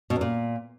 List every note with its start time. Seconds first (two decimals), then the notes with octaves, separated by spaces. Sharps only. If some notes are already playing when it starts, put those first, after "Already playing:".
0.10 B2
0.16 E2
0.21 A#2